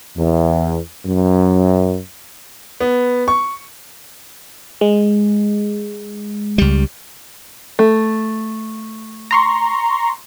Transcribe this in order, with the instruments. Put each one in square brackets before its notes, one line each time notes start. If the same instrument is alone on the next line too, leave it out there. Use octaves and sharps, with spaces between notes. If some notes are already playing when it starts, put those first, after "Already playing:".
[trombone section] E2
F#2
[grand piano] B3
C#6
[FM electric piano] G#3
[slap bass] C#2 G3
[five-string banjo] A3
[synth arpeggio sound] A#5 C6 C#6